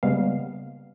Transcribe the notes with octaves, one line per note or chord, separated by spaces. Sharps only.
C#3 G3 G#3 A#3 B3 F5